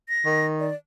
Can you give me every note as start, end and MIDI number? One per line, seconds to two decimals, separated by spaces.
0.09 0.46 94
0.25 0.71 51
0.60 0.75 74